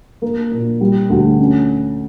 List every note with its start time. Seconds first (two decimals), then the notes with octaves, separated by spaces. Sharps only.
0.22 A#3
0.51 A#2
0.81 G3
1.10 D2
1.39 C#4